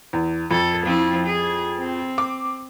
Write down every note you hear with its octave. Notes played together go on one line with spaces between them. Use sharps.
E2
F2 A4
F3 C4 E4
G#4
C4
D6